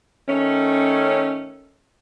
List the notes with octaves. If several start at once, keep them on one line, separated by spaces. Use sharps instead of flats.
D#3 A3 C#4